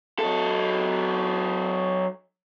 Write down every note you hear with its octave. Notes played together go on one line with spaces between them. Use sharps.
F#3 A4